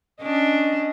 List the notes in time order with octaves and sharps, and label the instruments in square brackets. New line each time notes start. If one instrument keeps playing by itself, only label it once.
[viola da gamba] C#4 D4 [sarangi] D#5